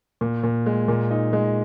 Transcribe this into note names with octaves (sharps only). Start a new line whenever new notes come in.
A#2
A#2
G#3
A#2
D#4
G#3